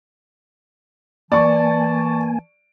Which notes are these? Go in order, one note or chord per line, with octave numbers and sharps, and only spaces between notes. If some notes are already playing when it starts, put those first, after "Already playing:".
E3 A#3 D5 G#5 A5 C#6